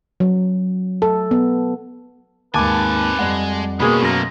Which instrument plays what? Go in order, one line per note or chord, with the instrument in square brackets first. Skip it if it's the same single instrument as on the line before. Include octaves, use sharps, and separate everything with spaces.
[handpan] F#3
A4
B3
[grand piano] D#2 G#2 [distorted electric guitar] C4 G#5 [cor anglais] B4 [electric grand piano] A5 D6
[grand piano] F2 G3 F#5 [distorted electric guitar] G#3
[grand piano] B2 [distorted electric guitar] D#3 C#4 [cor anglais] G#3 [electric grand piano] A#3 G#4 B5
[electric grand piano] F#2 A#6 [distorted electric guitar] A2 [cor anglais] A#3